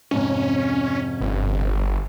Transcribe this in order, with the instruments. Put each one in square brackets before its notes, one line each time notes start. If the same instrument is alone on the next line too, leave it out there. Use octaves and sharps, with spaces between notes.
[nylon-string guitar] F2 G#2 C3 [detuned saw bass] C#4
[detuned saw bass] G1